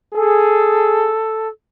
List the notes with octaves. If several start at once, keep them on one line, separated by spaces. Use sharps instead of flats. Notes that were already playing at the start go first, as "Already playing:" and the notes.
G#4 A4